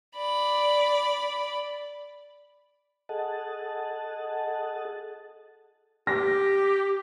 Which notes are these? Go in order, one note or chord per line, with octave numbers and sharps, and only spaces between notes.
D5 B5
G#4 A4 D#5 F#5 A5
G4 A#6